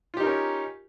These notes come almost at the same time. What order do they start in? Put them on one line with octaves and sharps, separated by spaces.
F4 G4 D#4 A#4 C#4